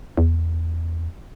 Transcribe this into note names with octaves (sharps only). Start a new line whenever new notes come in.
E2